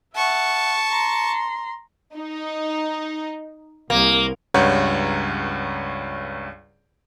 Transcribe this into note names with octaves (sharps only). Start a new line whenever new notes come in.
E5 F#5 A5 C#6
A#5 C6
D#4
C2 A#3
C#2 G2 C#5 F#5 A#5 G6